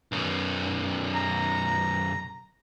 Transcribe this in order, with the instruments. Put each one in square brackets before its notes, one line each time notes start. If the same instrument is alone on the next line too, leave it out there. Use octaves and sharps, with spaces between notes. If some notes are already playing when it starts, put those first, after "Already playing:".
[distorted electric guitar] B1 F#2
[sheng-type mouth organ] A#5